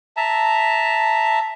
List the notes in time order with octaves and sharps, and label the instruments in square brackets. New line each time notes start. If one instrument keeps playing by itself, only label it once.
[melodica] E5 A5 A#5